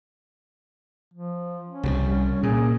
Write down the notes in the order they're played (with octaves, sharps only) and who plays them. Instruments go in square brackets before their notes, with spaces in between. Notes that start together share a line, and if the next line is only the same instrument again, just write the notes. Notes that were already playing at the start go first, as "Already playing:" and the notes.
[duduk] F3
C#4
[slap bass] C2 E3 G3
[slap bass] A#2 [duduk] G#4